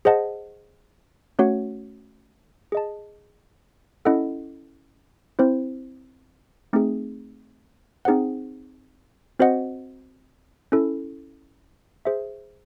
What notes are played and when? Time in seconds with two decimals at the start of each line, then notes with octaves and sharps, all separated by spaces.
0.05 G#4 C5 D#5 F#5 A5
1.39 A3 C#4 F#4 C#5 F#5
2.72 G#4 D#5 A5
4.05 C#4 E4 A4 D#5 F#5
5.39 C4 E4 C5
6.73 A3 C4 D#4 G#4
8.05 C4 D#4 G#4 C5 F#5
9.39 C4 F#4 C5 D#5 F#5
10.72 C#4 E4 A4
12.05 G#4 C5 E5